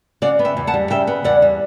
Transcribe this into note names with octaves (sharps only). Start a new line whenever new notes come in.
C#3 D5 F#5
B3
E5 G5
E2
F#5 A5
G3
C#3 E5 G5
B3
E2 D5 F#5
G3